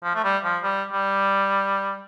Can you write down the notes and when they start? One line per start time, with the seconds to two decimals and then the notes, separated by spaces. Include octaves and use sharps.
0.04 F3
0.15 A3
0.24 G3
0.44 F3
0.63 G3
0.93 G3